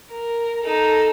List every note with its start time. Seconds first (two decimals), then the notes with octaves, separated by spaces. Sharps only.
0.11 A#4
0.63 D#4 A4